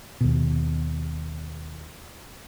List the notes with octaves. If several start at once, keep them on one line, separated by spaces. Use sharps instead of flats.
D#2 B2